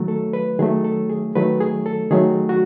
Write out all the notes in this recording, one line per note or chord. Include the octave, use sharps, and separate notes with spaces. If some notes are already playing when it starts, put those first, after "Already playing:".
Already playing: D#3 F#3 A3
A4
B4
D#3 F#3 A3 G#4
A4
G#4
D#3 F#3 A3 B4
G#4
A4
D#3 F#3 A3 G#4
F#4